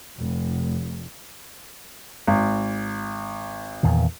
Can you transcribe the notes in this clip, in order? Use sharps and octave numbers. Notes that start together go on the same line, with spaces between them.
F1
G#1
E2 A#2 D#3